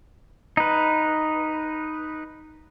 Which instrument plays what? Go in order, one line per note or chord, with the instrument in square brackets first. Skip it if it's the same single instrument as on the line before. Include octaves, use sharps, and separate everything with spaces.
[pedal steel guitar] D#4 B4